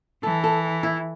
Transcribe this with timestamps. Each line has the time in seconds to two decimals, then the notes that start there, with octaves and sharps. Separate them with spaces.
0.23 E3 A4
0.44 A4
0.83 E4